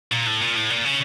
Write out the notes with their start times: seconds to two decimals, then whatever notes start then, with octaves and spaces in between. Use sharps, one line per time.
0.12 A#2
0.27 A2
0.41 A#2
0.56 A2
0.70 A#2
0.84 C#3